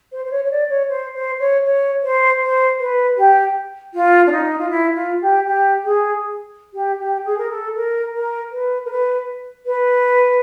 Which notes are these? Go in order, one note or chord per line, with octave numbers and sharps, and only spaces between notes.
C5
C5
C#5
C#5
D5
C#5
C5
C5
C#5
C#5
C5
C5
B4
G4
F4
D4
D#4
F4
E4
F4
G4
G4
G#4
G4
G4
G#4
A#4
A4
A#4
A#4
B4
A#4
B4
B4